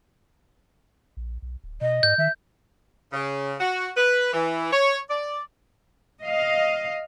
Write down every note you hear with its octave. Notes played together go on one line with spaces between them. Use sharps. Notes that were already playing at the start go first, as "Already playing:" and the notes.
A#1
B1
D1
B2 D#5
G#2 G6
D#3 E5
C#3
F#4
B4
E3
C#5
D5
D#5 F5